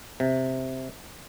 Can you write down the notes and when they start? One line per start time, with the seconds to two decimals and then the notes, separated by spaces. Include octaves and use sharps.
0.20 C3